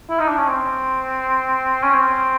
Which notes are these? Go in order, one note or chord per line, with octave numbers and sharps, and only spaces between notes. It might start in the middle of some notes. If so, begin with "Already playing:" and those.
E4
D#4
D4
C#4
C4
C#4
C4